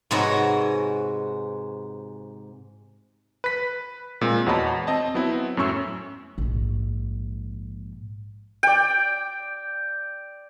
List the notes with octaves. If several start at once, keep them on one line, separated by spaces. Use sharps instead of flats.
G#2 C3 F#4 B4 C#5 D#5
B4 B6
A#2 G#3 C4
E2 F#4 C#5 D#5 A5 B5
C4 D#5 A5
F#3 B3 C4 E4
F#2 A2 C#4 C#6 E6
A#1 G#2
D5 G5